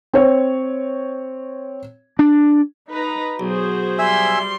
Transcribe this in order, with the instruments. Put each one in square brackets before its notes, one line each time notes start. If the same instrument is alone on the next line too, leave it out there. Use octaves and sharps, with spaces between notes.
[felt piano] C4 C#5
[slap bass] D4
[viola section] D#4 B4 A#5
[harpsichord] B1 [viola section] F#4 G#4 C5
[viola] G3 C6 [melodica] E5 G#5 E6